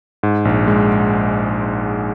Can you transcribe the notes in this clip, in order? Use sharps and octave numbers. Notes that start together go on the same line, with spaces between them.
G#2
A#1
G#3